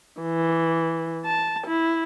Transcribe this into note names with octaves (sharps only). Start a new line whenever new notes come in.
E3
A5
E4